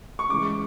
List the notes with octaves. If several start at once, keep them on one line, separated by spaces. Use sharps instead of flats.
C#6
C#3 E3 G#3 C#4 D6